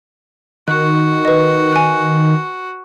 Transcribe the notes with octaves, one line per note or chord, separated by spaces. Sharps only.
D#3 F#4 F#6
B4 D#5
G#5 F#6